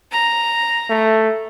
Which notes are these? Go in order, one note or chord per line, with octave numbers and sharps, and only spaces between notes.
A#5
A3